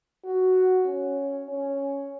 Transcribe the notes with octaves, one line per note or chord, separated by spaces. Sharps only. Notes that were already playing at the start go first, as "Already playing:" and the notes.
F#4
C#4
C#4